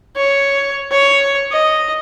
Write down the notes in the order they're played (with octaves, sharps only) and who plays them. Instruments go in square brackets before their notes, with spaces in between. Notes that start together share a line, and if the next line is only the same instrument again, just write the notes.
[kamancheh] C#5
C#5
D#5